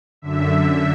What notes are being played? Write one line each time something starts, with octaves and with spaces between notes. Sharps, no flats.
F#2 D3 E5